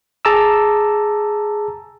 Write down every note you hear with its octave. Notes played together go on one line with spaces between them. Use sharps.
G#4 A5 A#5 D6 E6